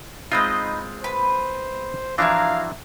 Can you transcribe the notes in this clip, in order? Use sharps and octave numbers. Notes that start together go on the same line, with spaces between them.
G#3 C4 D#4 F4 B4 D#5
B4 C5
E3 F3 D4 E4 F#4 F5 A#5